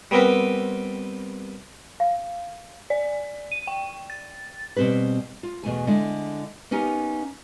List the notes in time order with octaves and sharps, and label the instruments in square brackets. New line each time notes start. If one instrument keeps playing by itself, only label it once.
[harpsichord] G3 B3 C4 A#4 B4
[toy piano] F5
[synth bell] D5
D#7
G5
A6
[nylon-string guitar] B2 G3 C4 G4 B4
F4
E2 B2 A3 G#5
D3 G#3 E4
A#3 B3 C#4 D#4 G4